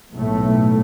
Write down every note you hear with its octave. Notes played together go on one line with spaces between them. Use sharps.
B1 A2 A3